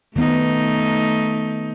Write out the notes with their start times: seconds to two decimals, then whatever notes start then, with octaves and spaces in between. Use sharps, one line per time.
0.16 D#3 A3 B3 D#4